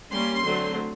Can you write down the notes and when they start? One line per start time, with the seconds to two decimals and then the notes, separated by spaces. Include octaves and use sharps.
0.11 G3 A#3 C#4 C6
0.43 D3 F#3 A3 C4